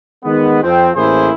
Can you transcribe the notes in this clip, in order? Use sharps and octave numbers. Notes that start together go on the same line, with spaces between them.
D#3 G#3 B3
F2 F3 C4
A1 A#3 E4 G#4 C5